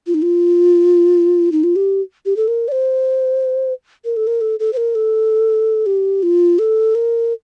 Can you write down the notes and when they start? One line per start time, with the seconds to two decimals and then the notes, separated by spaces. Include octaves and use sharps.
0.07 F4
0.14 D#4
0.22 F4
1.52 D#4
1.64 F4
1.76 G4
2.26 G4
2.37 A4
2.48 A#4
2.68 D5
2.72 C5
4.05 A#4
4.16 A4
4.27 A#4
4.41 A4
4.60 A4
4.73 C5
4.77 A#4
4.95 A4
5.86 G4
6.23 F4
6.59 A4
6.95 A#4